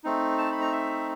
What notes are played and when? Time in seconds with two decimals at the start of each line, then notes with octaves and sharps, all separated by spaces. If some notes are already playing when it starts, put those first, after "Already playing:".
0.04 A3 C4 D#4
0.38 A5
0.52 B5
0.61 A#5
0.72 E5